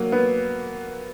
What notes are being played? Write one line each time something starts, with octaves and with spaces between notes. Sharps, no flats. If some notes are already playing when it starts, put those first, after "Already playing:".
Already playing: F#3 A#3
B3